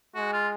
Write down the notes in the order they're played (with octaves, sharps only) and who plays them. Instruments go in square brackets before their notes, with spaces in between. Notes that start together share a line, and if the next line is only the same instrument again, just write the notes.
[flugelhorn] G#3 [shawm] F#4
[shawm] F4